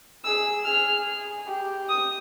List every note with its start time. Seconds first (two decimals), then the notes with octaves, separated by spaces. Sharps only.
0.25 G#4 E6
0.65 G#4 F6
1.47 G4
1.89 D#6